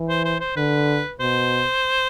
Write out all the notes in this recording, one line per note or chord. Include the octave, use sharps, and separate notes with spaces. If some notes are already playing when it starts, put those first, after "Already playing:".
Already playing: E3
C5
C5
C5
D3 B4
B2 C5